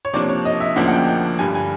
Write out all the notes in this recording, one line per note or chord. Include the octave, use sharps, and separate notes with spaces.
C#5
C3 F3 A#3 D4 D5
C#5
D#5
E5
D2 C#3 F3 A#3 D4 F#5
F#5
G5
G5
G2 D3 G3 G#5
G#5